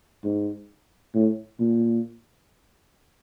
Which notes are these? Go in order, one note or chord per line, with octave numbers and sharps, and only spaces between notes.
G#2
A2
A#2